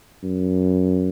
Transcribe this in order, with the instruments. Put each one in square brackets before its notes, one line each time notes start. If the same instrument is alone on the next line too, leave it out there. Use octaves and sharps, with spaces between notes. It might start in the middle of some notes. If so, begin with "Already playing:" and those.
[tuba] F#2